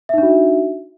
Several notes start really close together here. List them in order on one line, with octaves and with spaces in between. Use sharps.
E5 D#4 D4 F#4